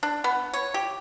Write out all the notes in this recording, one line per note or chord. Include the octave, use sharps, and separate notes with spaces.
D4
B3
C#5
G4